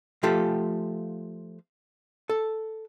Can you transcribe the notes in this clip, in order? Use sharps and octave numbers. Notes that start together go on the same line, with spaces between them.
F3 A3 F4 G4 A4
A4